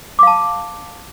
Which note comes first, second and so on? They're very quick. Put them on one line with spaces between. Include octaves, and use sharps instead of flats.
D6 F5 A5